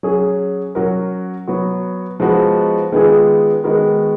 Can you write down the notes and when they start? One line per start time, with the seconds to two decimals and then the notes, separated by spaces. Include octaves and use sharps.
0.03 F#3 C#4 G#4
0.75 F#3 C#4 F#4 A#4
1.48 F#3 B3 F#4
2.20 F3 G#3 B3 D#4 F#4
2.92 D#3 G#3 B3 F4 G#4
3.64 D#3 G#3 B3 F#4 A#4